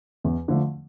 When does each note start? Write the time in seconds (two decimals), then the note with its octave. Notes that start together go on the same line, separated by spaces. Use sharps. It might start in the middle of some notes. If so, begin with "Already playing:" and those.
0.24 E2
0.48 D3 F3 A3